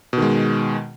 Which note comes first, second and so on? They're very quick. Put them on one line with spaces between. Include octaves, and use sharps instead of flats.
B2 D#3 G#3